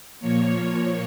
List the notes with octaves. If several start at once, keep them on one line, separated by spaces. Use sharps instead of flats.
A#2 F3 A#3 C#5